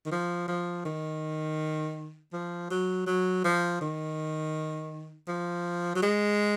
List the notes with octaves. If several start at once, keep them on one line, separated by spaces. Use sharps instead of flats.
D#3
F3
F3
D#3
F3
F#3
F#3
F3
D#3
F3
F#3
G#3